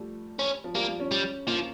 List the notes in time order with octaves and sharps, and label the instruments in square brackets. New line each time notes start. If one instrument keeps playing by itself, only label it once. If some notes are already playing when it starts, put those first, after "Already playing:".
Already playing: [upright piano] F3 G3 A3
[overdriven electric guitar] C#4
[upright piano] F3
[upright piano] G3 [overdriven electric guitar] A#3
[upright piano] F3
C#4
[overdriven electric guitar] G3
[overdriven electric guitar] F3 [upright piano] A#3